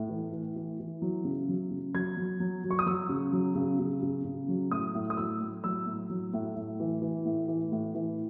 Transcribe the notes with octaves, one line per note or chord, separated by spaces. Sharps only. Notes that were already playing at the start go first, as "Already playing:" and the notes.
Already playing: A2
E3
E3
E3
E3
F#3
C#3
F#3
C#3
F#3 G#6
F#3
F#3
F#3
C#6
D#6
F#3 E6
C#3
F#3
C#3
C#3
C#3
C#3
F#3
A2 D#6
A2
D#6
F#3 E6
A2
F#3 E6
A2
F#3
A2
A2
E3
E3
A2
E3
A2
E3